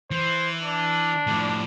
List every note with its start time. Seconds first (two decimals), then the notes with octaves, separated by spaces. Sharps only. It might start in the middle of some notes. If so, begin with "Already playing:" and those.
0.11 E3 C5
0.63 D4
1.27 A2 F3